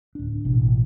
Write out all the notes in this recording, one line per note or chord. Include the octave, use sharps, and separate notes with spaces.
D1 D4
A1 B2